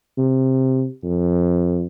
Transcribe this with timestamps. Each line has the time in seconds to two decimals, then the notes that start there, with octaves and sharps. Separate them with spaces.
0.18 C3
1.03 F2